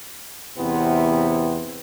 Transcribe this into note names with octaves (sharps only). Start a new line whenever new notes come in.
E2 C3 B3 C4 E4